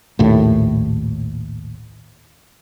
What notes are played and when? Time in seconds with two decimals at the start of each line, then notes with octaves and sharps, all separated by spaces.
0.19 A#1 D#2 A2